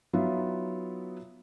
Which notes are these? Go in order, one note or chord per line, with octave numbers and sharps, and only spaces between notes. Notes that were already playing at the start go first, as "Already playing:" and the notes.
F#3 B3 D#4 F4 E5